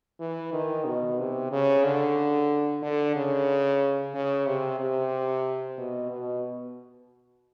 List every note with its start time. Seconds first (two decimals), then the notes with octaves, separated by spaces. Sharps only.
0.20 E3
0.53 D#3
0.86 B2
1.18 C3
1.52 C#3
1.84 D3
2.83 D3
3.16 C#3
4.14 C#3
4.46 C3
4.79 C3
5.78 B2
6.11 B2